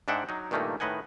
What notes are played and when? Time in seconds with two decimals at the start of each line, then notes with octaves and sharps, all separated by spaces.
0.08 G#2 G#3 D4 E5 F#5 G5
0.29 F#3 D#4
0.51 G2 A#2 D#3 A3 A#3 D#4
0.80 A2 D#3 B4 D#5 F#5 G#5